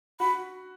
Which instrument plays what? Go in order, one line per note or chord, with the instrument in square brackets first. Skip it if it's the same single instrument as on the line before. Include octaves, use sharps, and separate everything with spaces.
[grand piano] F#4 [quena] B5